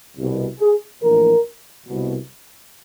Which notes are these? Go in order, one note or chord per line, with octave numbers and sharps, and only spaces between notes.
C2 B2
G#4
A#1 A2 E3 A#4
C2 B2